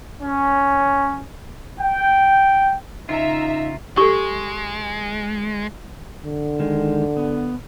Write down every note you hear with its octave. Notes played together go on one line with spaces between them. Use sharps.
C#4
G5
C#3 D#4 F4 E5 A#5
G#3 G4 A4 C#6
D3
D#3 G#3
B3